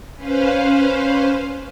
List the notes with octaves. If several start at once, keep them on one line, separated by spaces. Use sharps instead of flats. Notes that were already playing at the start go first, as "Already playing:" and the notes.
C#4 B4 C5 F5